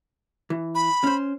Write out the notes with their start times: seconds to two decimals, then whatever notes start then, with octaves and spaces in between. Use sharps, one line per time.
0.50 E3
0.75 B5
1.04 C#4 C5